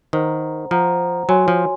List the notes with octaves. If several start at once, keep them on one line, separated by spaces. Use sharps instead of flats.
D#3 C5 F#5 A#5
F3 C5 F#5 A#5
F#3 F#4 C#5 G#5 C6
F3